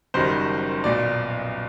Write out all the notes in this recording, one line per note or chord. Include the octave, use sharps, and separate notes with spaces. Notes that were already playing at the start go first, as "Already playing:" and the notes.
F#1 F#2 D#3 G3 C5
B1 A#2 F#3 D5